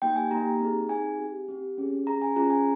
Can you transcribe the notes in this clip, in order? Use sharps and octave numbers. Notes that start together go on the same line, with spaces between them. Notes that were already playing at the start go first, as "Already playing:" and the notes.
A#3 D#4 G4 G5
G#5
A#3 D#4 G4 A#5
C4 D#4 G#4
C4 D#4 G#4 G#5
C4 G4
C4 G4
C#4 G#4
C#4 G#4 A#5
G#5
C#4 F4 G#4 A#5
G#5